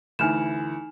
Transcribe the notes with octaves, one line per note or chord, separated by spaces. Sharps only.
D2 E3 D#4 G#5 F6 E7